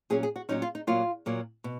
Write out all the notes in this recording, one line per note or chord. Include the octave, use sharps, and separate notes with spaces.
A#2 F#3 C#4 G#4
G#4
F#4
A#2 F#3 C#4 D#4
F4
D#4
A#2 F#3 A#3 F4
A#2 F#3 A#3
B2